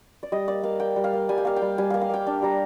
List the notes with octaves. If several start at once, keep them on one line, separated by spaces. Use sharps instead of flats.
D5
G3 D#5
A#3 D5
A#3 F5
A#3 G5
G3
F5
A#3
G3 G#5
G5
A#3 F5
G5
G3
G3 G#5
A#3 F5
F5
A#3 G5
D4
G3 A#5